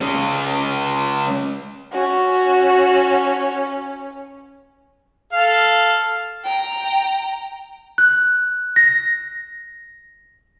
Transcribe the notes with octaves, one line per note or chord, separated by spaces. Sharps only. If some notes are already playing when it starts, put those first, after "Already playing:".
G#3 C#4
C#4 F#4
A4 F5
G5 A#5
F#6
A#6